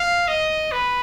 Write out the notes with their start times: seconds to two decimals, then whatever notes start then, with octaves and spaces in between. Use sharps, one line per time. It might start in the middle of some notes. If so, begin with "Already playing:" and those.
Already playing: F5
0.28 D#5
0.72 B4